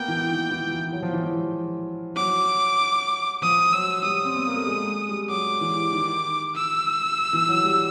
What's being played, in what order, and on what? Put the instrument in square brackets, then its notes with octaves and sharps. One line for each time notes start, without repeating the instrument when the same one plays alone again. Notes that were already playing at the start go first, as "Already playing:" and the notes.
Already playing: [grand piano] A#3 B3 [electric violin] G5
[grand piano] E3
D#3
E3
E3
F#3
F3
E3
F3
[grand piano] F#3 [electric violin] D6
[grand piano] F3 [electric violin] D#6
[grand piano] F#3 [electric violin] E6
[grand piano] G3 [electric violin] D#6
[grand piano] C4
B3
A#3
A3
G#3
G3
[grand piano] F#3 [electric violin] D6
[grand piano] E3
D#3
[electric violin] E6
[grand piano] E3
F#3
G3